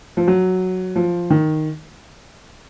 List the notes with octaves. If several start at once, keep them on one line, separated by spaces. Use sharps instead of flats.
F3
F#3
F3
D#3